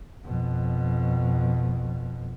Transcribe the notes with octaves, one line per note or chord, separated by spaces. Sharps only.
F2 B2